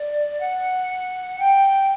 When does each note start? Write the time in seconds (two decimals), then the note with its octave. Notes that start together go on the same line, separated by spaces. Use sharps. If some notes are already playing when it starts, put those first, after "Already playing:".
Already playing: D5
0.40 F#5
1.39 G5